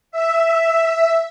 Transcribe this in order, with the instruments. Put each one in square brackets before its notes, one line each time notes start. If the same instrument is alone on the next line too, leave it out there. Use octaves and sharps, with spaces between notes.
[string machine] E5